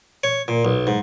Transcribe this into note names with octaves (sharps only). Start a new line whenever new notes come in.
C#5
A#2
B1
G#2